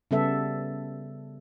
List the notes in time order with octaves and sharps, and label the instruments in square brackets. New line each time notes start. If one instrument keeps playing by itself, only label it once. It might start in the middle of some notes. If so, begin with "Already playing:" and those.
[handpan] C#3 G3 B3 A4 E5